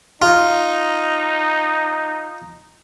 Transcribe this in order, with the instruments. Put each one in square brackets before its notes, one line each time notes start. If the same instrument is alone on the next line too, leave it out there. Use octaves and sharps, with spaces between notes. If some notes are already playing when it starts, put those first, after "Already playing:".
[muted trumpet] D#4 [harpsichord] F4